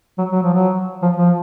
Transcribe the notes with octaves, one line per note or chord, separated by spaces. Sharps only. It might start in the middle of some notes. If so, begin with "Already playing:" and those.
F#3
F#3
F3
F#3
F3
F3